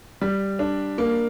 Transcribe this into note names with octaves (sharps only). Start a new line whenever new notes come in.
G3
D4
A#3